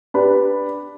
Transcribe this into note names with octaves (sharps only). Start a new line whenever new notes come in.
D4 G4 B4 B5